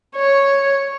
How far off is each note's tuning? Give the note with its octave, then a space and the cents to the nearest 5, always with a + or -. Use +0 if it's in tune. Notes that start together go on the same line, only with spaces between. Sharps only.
C#5 -5